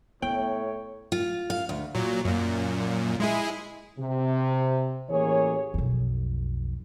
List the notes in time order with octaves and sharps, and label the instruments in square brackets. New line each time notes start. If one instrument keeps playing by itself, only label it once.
[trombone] A2 [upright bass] B3 [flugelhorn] C#5 [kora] G5
[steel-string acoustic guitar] F4
F5
D2
[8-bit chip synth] A#2 F#3
F#2 A#2
G#3 E4 G#4
[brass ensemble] C3
A1 E3 A#3 G#4 C#5
[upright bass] B1 F2